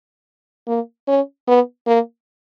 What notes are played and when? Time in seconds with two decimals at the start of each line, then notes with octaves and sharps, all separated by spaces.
0.67 A#3
1.08 C#4
1.48 B3
1.87 A#3